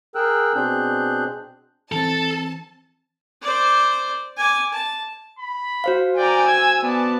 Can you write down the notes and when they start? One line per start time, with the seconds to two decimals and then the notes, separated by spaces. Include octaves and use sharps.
0.15 G#4 A#4 G5 E6 F#6
0.55 B2 C4 D4 G#4 F#6 G6
1.92 E3 C4 A4 A5
3.42 C5 D5
4.37 G#5 D6
4.73 A5
5.39 B5
5.84 F#4 C5 F5
6.18 D5 G5 G#5 A#5
6.48 E6 G#6
6.83 B3 D5 A5